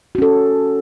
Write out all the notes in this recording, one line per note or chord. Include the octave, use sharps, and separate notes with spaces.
C#4 F#4 A4